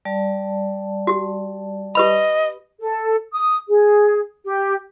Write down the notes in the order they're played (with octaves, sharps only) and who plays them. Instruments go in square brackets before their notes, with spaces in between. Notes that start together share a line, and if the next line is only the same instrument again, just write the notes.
[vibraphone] G3 D5 A5
[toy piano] F#4 G4
[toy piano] G4 B4 B5 [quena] D#5
[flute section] A4
D#6
G#4
G4